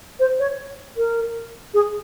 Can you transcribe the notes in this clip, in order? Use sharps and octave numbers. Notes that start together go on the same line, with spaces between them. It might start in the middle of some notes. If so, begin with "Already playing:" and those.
C5
C#5
A#4
G#4